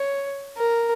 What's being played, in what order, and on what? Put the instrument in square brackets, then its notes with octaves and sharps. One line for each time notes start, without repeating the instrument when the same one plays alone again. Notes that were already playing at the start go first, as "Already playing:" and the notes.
Already playing: [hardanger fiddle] C#5
A#4